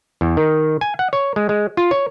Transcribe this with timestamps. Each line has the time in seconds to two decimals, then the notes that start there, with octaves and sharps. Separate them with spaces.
0.21 E2
0.37 D#3
0.81 G#5
0.99 F#5
1.13 C#5
1.36 G#3
1.49 G#3
1.77 F4
1.91 C#5